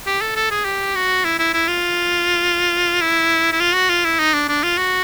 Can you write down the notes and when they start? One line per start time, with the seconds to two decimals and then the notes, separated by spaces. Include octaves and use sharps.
0.06 G4
0.21 A4
0.36 A4
0.51 G#4
0.65 G4
0.95 F#4
1.25 E4
1.39 E4
1.54 E4
1.68 F4
3.01 E4
3.52 E4
3.60 F4
3.74 F#4
3.89 F4
4.04 E4
4.19 D#4
4.34 D4
4.48 D4
4.63 F4
4.78 F#4